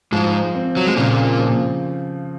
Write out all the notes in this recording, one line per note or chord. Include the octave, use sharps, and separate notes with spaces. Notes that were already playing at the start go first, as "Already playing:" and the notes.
G#2 F3 G#3
C4
F#3
G#3
A#2 C#3 A#3
F3